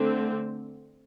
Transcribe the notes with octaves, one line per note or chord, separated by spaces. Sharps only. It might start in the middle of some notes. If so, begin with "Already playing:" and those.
Already playing: D3 A3 C4